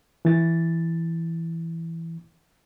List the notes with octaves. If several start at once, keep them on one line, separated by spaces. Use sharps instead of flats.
E3 A6